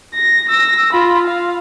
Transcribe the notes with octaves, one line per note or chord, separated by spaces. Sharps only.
A#6
E6 A#6
F4 B5
F5